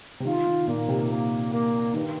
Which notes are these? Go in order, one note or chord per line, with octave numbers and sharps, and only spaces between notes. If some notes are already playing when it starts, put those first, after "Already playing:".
C3
D#3 F4
D#3
A#2 A#3
C3
A#3
A#3
G2 D#3